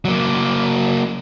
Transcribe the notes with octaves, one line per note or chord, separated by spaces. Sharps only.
F#3 A#3